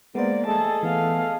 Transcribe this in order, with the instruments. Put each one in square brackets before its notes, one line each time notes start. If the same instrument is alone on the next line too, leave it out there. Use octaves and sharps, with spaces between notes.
[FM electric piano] G#3 C5 [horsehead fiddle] A#3 D5 [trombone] B3
[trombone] A3 [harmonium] G#4 A4 D#5 [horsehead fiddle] A5
[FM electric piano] E3 [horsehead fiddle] A3 F5 [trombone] B3